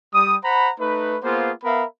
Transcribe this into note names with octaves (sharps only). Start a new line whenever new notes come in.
G3 D#6
C5 F#5 A#5 B5
A3 D#4 B4
A#3 B3 F4 G#4 C5
B3 A#4 E5 F5 B5